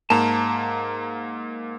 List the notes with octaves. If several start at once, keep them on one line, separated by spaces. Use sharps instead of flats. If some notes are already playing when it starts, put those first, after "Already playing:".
G#2 A#3 A5 A#5